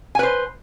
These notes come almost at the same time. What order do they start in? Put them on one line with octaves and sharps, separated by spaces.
G#5 B4 C5